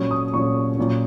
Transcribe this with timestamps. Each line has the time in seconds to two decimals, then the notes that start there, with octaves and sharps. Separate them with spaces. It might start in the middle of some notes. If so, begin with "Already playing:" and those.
Already playing: A#2 F#3 C#4 C#6
0.11 D#6
0.34 A#2 F#3 C#4 C#6
0.78 A#2 F#3 C#4